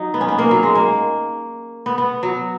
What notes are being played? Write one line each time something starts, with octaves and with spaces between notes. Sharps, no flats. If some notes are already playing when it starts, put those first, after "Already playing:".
Already playing: F#3 D#4
B3
C#4
B3
A#3
F#3
G#3
A#3
B3
B3
F#3